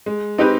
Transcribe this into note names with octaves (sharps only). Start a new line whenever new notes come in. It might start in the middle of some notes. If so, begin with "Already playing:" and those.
G#3
C4 D#4 G4 B4